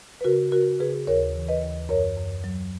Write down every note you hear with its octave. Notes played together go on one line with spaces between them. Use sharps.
B4
C#3 F#4 A#4
C#3 F#4 A#4
C#3 G#4 B4
D#2 A#4 C#5
E3
B4 D#5
D#2
F#2 A#4 C#5
F#2
F#3